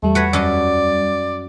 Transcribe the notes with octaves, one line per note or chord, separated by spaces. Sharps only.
E2 G3 A3
F#4 B4 C#5
F#2 D5 D#5 A5